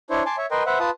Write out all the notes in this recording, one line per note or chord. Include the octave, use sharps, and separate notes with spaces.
D4 E4 C5 C#5
G#5 A5 C6 D6
C#5 E5
A#4 B4 D#5 G5 C6
B4 C5 E5 F#5
F4 B4 A5 D#6